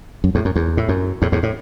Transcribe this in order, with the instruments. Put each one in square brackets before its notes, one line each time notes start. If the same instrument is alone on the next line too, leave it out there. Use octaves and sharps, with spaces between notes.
[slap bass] F#2
E2 A2
F#2
E2
A2
F#2
E2 A2
E2 A2
A2